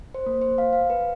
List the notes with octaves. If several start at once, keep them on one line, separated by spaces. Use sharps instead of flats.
C5
A#3
C5
F5
F5
B4